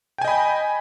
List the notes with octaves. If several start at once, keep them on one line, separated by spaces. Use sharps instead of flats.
D#5 G5 G#5 B5